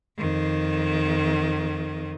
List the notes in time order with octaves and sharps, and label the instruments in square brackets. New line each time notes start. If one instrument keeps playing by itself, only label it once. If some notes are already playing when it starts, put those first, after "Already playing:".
[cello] F2 D#3